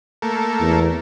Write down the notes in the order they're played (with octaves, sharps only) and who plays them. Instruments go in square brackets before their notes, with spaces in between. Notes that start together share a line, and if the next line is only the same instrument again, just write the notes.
[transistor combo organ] A3 A#3
[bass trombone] E2